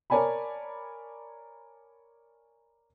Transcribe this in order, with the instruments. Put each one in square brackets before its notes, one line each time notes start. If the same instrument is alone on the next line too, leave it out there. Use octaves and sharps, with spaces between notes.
[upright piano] A#4 C#5 D5 G#5 A5 B5